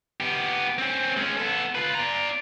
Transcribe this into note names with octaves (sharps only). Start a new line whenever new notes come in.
B3 G4
C4 C#4
G#3 C#4
B3 A4
F4 B4
D5 A#5